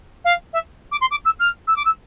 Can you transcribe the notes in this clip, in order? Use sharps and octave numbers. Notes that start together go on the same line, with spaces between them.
F5
E5
D6
C6
D6
E6
F6
E6
D6
E6